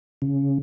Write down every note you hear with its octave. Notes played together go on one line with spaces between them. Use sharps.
C#3